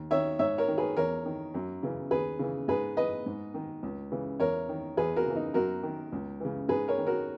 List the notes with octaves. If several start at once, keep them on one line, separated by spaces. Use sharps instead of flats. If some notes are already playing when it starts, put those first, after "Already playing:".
Already playing: D#2
D#3 C#5 E5
G#2 C#5 E5
A#4 C#5
D#3
G#4 B4
E2 A#4 C#5
D#3
F#2
C#3 E3
D#2 G#4 B4
C#3 E3
G#2 G#4 B4
E3 B4 D#5
G#2
D#3
C#2
C#3 E3
E2 A#4 C#5
D#3
E2 G#4 B4
F#4 A#4
C#3 E3
D#4
F#2 F#4 A#4
D#3
C#2
C#3 E3
G#2 G#4 B4
A#4 C#5
D#3
F#4 A#4